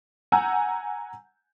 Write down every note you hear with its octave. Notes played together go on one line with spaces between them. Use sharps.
F#5 G#5 A#5 E6 G6